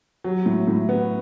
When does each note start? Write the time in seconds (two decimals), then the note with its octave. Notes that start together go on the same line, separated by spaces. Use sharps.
0.24 F#3
0.46 A2
0.67 A2
0.89 B3